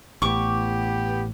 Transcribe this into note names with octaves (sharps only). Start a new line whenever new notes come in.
A1 A2 B3 G4 C#6 D6